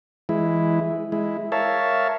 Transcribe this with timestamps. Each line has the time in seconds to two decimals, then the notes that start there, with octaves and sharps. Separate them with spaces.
0.29 E3 G#3 E4
1.12 G#3 E4
1.52 A#4 C#5 E5 F5 A5